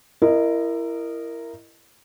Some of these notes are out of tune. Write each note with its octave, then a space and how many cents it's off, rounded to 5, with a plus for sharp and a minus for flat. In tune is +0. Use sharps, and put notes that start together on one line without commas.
E4 +20 A#4 -5 D#5 -20